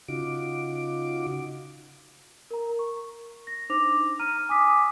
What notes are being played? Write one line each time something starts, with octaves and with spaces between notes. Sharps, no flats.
C#3 D#4 F4 F#4 D6
A#4 A#5
C#6
A#6
D4 D#4 C5 D6 A#6 F7
A#5 F6 D#7
G#5 D6 D#6 B6